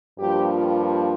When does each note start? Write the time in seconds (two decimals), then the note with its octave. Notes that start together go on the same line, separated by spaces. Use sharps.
0.18 G2 F3 A#3 G4
0.54 F4